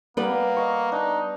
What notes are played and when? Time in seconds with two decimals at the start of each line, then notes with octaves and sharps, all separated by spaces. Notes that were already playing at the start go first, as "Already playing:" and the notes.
0.17 G3 A#3 B3 B4
0.57 D#5 C#6
0.92 D4 D#4